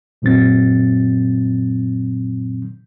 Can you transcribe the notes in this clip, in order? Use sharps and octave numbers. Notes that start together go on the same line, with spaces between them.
F#2 A#2 F#3 C4 A6